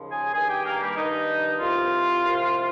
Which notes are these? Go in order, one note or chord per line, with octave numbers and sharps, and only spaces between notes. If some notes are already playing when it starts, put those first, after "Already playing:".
Already playing: D#2 C#3 F3
G#4 G#5
G2 D#3 G#4 G#5
G4 G5
A#3 A#4
G3 G4
G2 D#3 D#4
C2 C3 F3 F4
C2 C3 F3